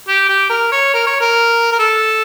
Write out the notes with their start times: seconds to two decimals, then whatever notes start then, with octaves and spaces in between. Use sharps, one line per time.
0.08 G4
0.29 G4
0.50 A#4
0.72 C#5
0.94 A#4
1.07 C#5
1.21 A#4
1.72 A#4
1.79 A4